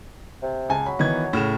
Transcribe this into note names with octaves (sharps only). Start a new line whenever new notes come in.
C3
C#2 G#5 A5
F#3 B5
D#3 E3 B3 G#6
A2 C#3 F6 E7